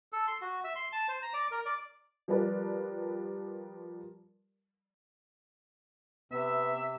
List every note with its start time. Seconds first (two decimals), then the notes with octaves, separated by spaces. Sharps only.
0.13 A4
0.27 C6
0.41 F#4
0.64 E5
0.76 C6
0.92 A5
1.08 C5
1.22 A#5
1.34 D5
1.51 A#4
1.65 D5
2.28 F3 G3 G4 A#4 B4 D5
6.32 C3 B3 E5 E6